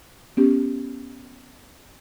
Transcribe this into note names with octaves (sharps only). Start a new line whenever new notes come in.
B3 C#4 G4